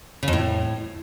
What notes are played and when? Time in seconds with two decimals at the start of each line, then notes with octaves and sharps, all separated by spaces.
0.23 C#3
0.28 F2
0.33 A2